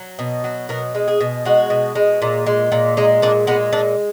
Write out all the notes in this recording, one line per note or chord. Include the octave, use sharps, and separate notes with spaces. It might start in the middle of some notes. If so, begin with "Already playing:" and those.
Already playing: F#3
B2
F#3
B2 A#4
G#3
G#4
B2
G#3 F#4
B2
G#3
A#2
G#3
A#2
G#3 D#4
A#2 D4
G#3 B3
A#2 D4